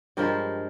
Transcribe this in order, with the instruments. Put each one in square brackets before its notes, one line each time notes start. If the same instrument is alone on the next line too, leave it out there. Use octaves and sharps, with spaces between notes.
[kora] G2 F3 G#3 G4 A#4